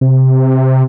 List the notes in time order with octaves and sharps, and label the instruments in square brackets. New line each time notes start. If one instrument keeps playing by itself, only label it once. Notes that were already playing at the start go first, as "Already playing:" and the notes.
[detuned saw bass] C3